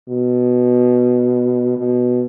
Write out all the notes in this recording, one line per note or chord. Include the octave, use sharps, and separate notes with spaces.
B2
B2